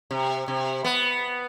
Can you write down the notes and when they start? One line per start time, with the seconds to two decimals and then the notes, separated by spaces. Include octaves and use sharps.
0.11 C3
0.48 C3
0.84 B3